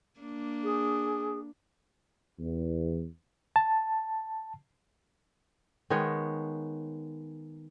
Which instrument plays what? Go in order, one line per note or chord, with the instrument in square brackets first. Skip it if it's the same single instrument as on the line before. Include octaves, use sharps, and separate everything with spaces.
[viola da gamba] A#3 D4
[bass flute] G#4
[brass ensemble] E2
[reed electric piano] A5
[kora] D#3 G#3 B3 C#5